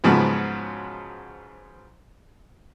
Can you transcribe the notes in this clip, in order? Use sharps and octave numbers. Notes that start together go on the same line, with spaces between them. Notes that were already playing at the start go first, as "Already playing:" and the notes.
G#2 C#3 F3 F#3 B3